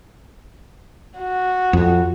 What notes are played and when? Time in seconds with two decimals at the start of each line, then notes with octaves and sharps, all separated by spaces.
1.18 F#4
1.73 F2